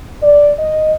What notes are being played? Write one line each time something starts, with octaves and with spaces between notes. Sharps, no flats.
D5
D#5